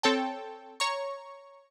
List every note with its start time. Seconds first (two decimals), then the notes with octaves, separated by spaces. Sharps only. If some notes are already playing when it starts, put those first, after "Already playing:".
0.03 C4 A4 C#5 G5 A5
0.80 C#5 A#5 C#6